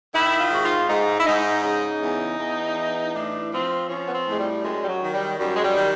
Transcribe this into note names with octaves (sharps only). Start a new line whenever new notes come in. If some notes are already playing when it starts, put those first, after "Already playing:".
D#3 E4
F4
G#2 F#4
F4
G#2 D#4
E4
G#2 D#4
C#3 D#4
E2
E2
E3
A2 D4
F3 C4
F3 C#4
B3
C4
A2
G#3
G3
F#2 G#3
G3
F#3
D#3
G3
F#2 G3
G#3
G3
D#3